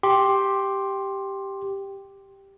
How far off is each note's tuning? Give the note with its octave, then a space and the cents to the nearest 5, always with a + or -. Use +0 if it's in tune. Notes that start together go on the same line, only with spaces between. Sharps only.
G4 +0 C6 +15